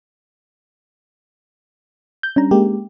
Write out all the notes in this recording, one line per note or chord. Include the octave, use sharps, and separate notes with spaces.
G6
G3 C#4 D4 A#5
G#3 A#3 G4